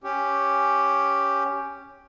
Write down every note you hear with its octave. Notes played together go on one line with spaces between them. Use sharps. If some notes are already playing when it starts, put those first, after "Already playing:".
C#4 G4